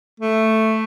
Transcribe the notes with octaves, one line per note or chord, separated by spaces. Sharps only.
A3